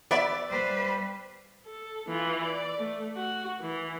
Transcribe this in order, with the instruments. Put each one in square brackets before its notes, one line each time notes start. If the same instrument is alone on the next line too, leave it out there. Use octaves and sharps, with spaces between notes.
[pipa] B3 G4 E5 [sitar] D5
[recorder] G3 [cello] B4 C5
[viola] A4
E3 F4
D5
A3
F#4
E3